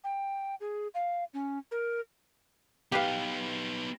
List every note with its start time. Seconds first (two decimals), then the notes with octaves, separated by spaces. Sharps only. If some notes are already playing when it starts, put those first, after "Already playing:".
0.04 G5
0.61 G#4
0.94 F5
1.34 C#4
1.71 A#4
2.92 B3 D#4 G4 B4 F5